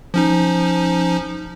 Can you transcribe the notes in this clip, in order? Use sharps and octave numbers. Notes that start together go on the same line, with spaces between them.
F3 C#4 D#4